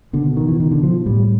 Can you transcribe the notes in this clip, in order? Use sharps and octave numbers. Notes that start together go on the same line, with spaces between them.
B2 D3
D#3
E3
D#3
D3
F3
A2 G3